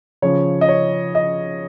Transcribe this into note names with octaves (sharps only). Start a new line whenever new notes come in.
C#3 F3 C#5
D#5
C#5
D#5